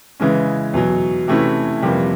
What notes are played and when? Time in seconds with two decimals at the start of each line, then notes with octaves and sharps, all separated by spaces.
0.20 C#3 E3 G#3 C#4
0.74 E2 B2 F#3
1.28 C3 E3 A3 C#4 E4
1.83 F2 C3 E3 G3 A#3